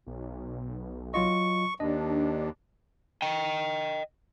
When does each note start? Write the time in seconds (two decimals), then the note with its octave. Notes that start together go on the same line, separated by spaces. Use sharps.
0.07 B1
1.14 F#3 F4 D#5 C#6
1.80 D#2 D4 D#5
3.22 D#5 G5